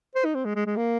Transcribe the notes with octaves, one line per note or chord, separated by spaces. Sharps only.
C5
D#4
C4
G#3
G#3
G#3
A#3